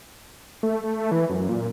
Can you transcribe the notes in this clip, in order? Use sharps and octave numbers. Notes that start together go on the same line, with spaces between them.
A3
A3
E3
F#2
A#2